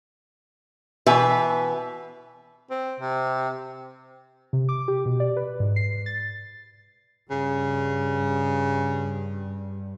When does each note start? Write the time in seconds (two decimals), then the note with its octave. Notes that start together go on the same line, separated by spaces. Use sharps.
1.06 B2 E3 B4 E5
2.71 C4
3.00 C3
4.53 C3
4.69 D6
4.88 G4
5.06 B2
5.20 D5
5.37 B4
5.60 G#2
5.76 C7
6.06 A6
7.30 G2 C#3